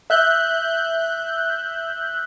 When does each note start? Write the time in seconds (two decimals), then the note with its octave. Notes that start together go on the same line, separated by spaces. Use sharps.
0.10 E5 F#6 G6